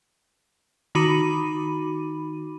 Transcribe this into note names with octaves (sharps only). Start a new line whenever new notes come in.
D#3 D#4 F#4 B5 D6 D#7